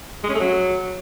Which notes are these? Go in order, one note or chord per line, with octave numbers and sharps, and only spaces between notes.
G#3
C#4
A3
F#3